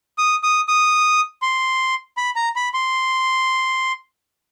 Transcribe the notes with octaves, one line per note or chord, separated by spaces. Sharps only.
D#6
D#6
D#6
C6
B5
A#5
B5
C6